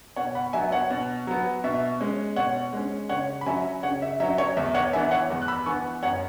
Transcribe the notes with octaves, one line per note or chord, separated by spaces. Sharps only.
B2 C#5 F#5
F#5 B5
F#3 B3 E5 G#5
C#5 F#5
B2
F#3 B3
B2 E5
G#3 C#4
B2 C#5 F#5
G#3 C#4
C#3 C#5 F#5
B5
F#3 C#4 E5 G#5
C#3 C#5 F#5
E5
F#3 C#4 E5
C#5
E2 E5
C#5 F#5
E3 B3 E5 G#5
C#5 F#5
E2
F#6
B5 E6
E3 B3 G#5 C#6
F#2 C#5 F#5